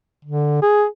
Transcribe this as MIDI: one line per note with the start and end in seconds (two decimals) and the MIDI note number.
0.25 0.59 50
0.62 0.85 68